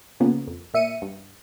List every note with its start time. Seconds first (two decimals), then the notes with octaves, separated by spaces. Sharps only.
0.20 C#3 F3 A#3 B3
0.48 F2
0.74 A#2 E5 C#7 D#7
1.02 G2